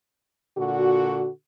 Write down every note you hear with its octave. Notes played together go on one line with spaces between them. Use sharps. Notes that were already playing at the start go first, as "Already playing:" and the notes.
A#2 D3 F#4